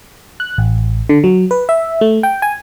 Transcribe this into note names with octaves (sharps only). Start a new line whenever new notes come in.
F#6
A1
D3
F#3
B4
E5
A3
G5
G#5